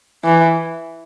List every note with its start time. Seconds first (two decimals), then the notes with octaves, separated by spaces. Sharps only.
0.24 E3